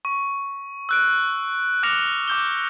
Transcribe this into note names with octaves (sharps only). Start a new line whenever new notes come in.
C#6
E6 F#6 D7
D6 F6 F#6 A#6 C#7 F7
D6 G6 G7